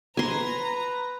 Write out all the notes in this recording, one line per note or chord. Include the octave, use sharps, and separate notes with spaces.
B4 G#5 A#5 C6